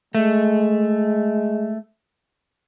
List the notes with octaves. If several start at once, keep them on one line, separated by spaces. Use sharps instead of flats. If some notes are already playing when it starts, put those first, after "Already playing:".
G#3 A3